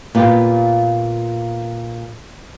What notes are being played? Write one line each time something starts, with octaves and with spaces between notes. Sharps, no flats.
A#2 B3 F4 G4